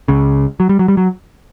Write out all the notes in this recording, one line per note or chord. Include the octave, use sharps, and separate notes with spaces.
C#2 C#3
F#3
G3
F#3
G3
F#3